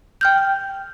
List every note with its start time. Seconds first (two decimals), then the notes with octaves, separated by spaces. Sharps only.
0.21 G5 F6 G6